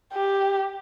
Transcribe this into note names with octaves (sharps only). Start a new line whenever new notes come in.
G4